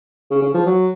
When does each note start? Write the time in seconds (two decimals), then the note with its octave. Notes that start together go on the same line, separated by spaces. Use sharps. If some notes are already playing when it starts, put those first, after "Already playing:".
0.30 C#3
0.42 C#3
0.54 F3
0.66 F#3